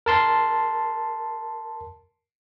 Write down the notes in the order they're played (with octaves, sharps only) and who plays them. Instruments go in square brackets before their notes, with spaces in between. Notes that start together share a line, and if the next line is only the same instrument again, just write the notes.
[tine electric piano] A#4 A5 C6